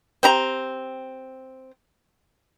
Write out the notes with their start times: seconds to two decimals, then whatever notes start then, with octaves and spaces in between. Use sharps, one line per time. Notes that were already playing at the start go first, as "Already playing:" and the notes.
0.23 C4 G4 A#5